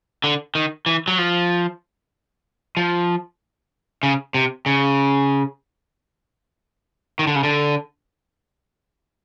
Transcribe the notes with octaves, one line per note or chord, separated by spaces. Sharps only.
D3
D#3
E3
F#3
F3
F3
C#3
C3
C#3
D#3
D3
C#3
D3